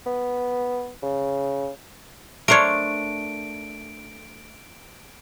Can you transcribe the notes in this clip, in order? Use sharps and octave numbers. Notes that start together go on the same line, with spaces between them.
B3
C#3
A3 D4 A#4 C5 C#5 D7